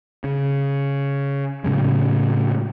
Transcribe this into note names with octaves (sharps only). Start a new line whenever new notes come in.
C#3
A2 C#3 F#3 G#3